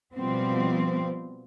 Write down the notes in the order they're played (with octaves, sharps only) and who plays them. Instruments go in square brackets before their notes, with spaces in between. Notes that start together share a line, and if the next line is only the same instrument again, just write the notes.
[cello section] B2 F3 G3 B3 C4